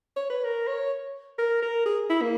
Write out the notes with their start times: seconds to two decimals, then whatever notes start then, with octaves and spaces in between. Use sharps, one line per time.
0.16 C#5
0.30 B4
0.44 A#4
0.67 C#5
1.38 A#4
1.62 A#4
1.86 G#4
2.10 E4
2.22 A#3